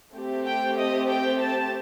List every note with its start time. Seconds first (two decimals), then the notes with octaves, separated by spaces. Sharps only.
0.14 A3 C4 G4
0.46 G5
0.76 D#5
1.08 G5
1.40 A5